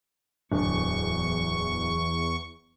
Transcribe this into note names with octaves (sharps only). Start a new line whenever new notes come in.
D1 E2 D3 C#6